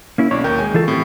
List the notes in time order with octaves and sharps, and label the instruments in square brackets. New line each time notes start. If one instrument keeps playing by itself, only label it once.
[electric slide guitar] A#3 C#4 E4
[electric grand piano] B1 [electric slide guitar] C#5 D5
[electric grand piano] D#2 A#4 C#6 [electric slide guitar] G5
[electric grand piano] G#3 G#5
[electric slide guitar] E3 F4 A4
[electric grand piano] A2 [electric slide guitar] C4 G4